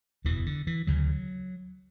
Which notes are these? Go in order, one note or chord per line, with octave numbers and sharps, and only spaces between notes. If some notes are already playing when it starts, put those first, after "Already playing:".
F#1 E2 B2 E3
D3
E3
D2 C#3 F#3